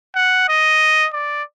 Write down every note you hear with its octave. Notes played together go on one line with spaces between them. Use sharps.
F#5
D#5
D5